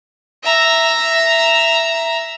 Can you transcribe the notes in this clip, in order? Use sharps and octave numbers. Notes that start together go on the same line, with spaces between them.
E5 A#5